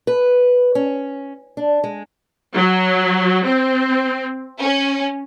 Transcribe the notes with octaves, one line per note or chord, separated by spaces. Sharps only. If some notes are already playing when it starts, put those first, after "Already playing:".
B4
C#4
D4
G#3
F#3
C4
C#4